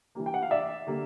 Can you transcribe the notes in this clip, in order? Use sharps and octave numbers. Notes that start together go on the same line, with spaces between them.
E3 G3 A#3
G5
F#5
F5
D5 E5
D3 G3 A#3